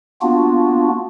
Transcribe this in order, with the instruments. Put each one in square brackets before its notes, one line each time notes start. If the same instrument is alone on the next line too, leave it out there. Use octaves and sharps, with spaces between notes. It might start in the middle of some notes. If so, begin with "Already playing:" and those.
[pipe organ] A#3 B3 D4 F4 F#4